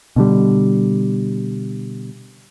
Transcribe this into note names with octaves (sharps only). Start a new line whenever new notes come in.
B2 D3 G3